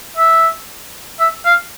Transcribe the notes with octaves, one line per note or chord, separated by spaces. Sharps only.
E5
E5
F5